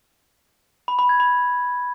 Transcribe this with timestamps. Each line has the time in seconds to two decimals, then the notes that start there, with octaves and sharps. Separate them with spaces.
0.88 B5
0.99 B5
1.09 G#6
1.20 B5